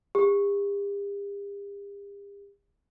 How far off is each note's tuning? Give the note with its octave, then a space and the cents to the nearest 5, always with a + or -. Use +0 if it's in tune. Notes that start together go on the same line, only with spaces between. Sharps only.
G4 +45